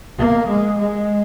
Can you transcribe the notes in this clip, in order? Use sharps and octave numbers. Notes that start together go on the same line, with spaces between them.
A#3
G#3
G#3